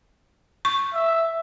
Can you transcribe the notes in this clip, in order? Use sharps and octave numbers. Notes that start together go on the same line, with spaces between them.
C#6
E5